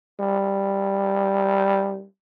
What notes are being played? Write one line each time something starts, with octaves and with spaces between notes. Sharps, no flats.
G3